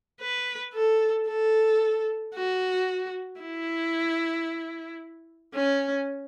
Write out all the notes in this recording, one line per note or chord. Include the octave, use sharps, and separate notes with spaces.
B4
A4
A4
F#4
E4
C#4